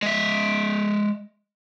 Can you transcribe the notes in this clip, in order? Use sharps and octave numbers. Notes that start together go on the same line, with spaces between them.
G#3 E5